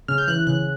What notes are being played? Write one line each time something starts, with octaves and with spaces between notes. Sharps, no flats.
C#3 F6
G6
E3 F#6
C#3 F#6